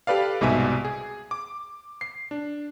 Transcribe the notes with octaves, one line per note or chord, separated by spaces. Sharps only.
G4 A4 B4 D5 F5
C2 G#2 B2 G#3 E5 G#5
G#4
D6
C7
D4